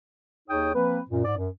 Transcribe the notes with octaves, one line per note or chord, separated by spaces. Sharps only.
D#2 D#4 G#4 C#5 G5 D#6
F3 A#3 C4 B4
F#2 A#2
G#2 D5
F#2